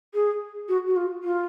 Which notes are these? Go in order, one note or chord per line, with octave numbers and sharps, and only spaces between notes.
G#4
F#4
F#4
F4
F4